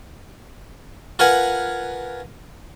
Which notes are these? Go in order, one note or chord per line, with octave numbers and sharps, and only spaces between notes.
F4 A#4 B4 F#5 G#5